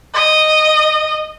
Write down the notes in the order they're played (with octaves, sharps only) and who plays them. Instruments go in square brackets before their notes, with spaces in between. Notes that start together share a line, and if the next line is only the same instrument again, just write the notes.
[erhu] D#5